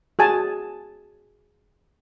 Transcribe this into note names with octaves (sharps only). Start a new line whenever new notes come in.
F#4 G#4 G#5 A5